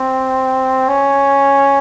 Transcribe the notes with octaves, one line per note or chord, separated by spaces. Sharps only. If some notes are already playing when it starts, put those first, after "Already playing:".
Already playing: C4
C#4